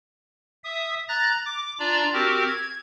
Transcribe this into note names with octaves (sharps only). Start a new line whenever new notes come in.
E5 D#6
A#5 F#6 A6 A#6
D6
D4 F4 D5 A#5
C4 F#4 G4 A#4
G#6